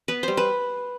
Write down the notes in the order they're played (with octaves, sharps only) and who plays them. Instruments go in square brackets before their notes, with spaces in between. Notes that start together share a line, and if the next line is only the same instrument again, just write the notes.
[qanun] B3 B4
G3 C5
B4